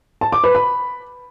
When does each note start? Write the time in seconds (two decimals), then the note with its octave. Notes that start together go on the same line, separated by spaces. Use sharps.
0.21 A5
0.32 D6
0.44 B4
0.55 B5